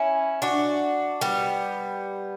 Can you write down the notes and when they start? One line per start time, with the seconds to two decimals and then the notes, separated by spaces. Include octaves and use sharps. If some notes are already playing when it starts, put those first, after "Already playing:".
Already playing: C#4 E4
0.42 D4 F#4
1.21 G3 B3